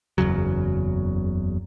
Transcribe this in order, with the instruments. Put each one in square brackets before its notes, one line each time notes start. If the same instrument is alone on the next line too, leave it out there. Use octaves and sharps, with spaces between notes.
[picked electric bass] F#1 E2 C#3 F#3